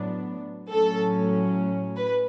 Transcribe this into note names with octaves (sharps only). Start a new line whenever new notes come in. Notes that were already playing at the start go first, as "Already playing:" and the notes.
Already playing: A2 F#3 B3 D4
A2 F#3 C#4 A4
B4